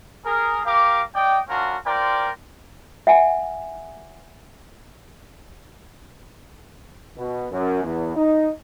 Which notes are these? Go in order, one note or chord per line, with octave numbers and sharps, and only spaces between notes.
G#4 A#4
G4 A#4 F5 D6
D5 D#5 G5
C#4 D4 F4 F#4 A#4
F4 A#4 C5 D5 G5
E5 F#5 G#5
B2
F#2
E2
D#4